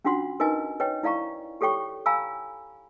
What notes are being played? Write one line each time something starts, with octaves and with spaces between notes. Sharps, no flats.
C#4 D4 F4 F#4 F#5 C6
D#4 A#4 B4 D#5 G#5
B4 C#5 D#5 G5
E4 D5 F5 A#5 C#6
G4 A4 C#5 G5 C#6
F5 G#5 A#5 B5 E6